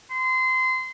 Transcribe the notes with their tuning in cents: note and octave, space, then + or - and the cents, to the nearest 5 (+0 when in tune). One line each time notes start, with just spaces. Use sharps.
C6 -25